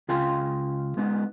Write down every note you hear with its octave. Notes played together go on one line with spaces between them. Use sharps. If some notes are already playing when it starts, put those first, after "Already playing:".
C#2 F4 G#4 F5 G5 C6
G#3 B3 D#4